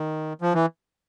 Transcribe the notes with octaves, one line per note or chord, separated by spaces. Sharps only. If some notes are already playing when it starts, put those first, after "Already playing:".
Already playing: D#3
F3
E3